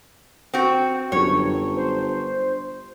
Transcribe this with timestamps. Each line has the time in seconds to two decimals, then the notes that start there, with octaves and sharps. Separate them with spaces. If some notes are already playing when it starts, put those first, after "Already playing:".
0.54 C4 F#4
1.12 G1 F#2 C#5
1.77 C5